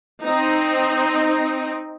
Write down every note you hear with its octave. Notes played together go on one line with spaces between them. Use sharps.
C4 D#4